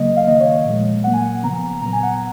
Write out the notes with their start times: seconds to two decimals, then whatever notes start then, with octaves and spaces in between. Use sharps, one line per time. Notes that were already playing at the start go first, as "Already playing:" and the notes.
Already playing: C#3 F#3 A#3 D#5
0.17 F5
0.27 D#3 A#3 D#5
0.40 C#5
0.65 A#2 F3 G#3
1.04 A#2 F#3 A#3 F#5
1.13 G#5
1.23 F#5
1.43 C#3 F3 B3 A#5
1.81 A#2 F#3 B3 A#5
1.93 G#5
2.03 F#5
2.14 G#5